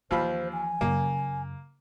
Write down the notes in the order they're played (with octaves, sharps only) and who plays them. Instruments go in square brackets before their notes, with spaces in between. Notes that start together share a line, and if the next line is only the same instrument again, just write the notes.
[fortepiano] D#2 F4 B5 [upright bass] E3 F3 [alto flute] C5
[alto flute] G#5
[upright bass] F#2 C#3 [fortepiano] A#3